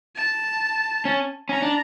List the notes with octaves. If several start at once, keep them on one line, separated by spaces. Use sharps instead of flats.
A5
C#4
C#4 A#5
D4